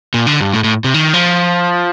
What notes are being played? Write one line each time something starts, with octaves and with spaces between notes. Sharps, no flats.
A#2
D3
G2
A2
A2
C3
D#3
F3